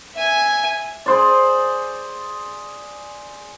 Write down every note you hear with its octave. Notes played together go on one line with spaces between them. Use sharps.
E5 G#5
G#4 C5 D5